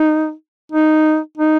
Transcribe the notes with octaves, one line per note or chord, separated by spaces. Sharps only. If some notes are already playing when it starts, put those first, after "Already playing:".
Already playing: D#4
D#4
D#4